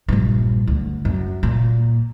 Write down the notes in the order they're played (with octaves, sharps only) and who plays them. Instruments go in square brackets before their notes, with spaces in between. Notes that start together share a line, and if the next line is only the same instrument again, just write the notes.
[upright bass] A#1 G2
D2
F#2
A#2